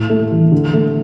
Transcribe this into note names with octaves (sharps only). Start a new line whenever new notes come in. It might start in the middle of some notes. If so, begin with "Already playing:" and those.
Already playing: A2
A3
E3
D3
A3